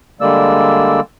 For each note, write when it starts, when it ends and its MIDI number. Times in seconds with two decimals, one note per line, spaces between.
0.21 1.00 50
0.21 1.00 55
0.21 1.00 56
0.21 1.00 58
0.21 1.00 74
0.21 1.00 88